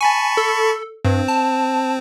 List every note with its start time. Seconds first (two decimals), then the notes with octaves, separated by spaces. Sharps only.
0.01 G#5 A5 B5 C#6
0.37 A4
1.05 G2 C4
1.28 A5